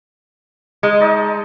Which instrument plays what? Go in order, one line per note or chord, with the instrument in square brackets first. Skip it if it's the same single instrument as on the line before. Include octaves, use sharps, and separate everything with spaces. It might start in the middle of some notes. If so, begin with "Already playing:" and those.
[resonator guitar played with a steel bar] G#3 [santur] D#4
[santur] D#4 D5 A5